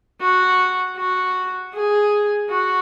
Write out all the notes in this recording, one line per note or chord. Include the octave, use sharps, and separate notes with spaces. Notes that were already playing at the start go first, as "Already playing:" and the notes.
F#4
F#4
G#4
F#4